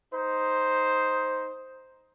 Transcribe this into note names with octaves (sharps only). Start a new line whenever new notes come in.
D#4 C5